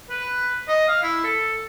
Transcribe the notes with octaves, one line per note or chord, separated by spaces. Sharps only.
B4
D#5
F5
E4
A4